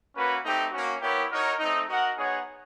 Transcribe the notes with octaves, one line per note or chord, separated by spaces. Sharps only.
A#3 C#4 F#4 B4
A3 C4 D#4 G4
A#3 C#4 F#4
B3 E4 G4 A#4 C#5
D#4 F#4 A#4 C#5
A3 C4 D#4
F#4 A#4 D#5 F#5
B3 D#4 G#4 C#5 F#5